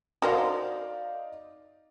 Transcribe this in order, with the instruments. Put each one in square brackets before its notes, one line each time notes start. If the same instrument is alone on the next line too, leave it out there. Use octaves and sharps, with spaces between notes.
[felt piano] D#4 D5 F5 [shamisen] F#4 A#4 C5